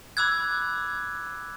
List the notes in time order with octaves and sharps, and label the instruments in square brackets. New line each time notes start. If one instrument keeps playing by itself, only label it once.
[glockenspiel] B5 D6 E6 F#6 G#6